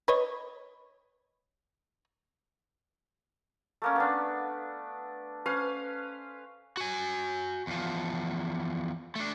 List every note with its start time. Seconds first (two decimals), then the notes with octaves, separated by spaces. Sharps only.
0.08 B4 C#5 D#5
3.82 A3 A#3 C#4
3.96 B3 D4
5.46 C#4 B4 C5 F5
6.77 F#4 G#5
7.67 E2 F3
9.16 A3 D4